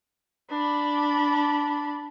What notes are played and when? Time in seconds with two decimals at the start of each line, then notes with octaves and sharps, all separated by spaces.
0.50 D4 B5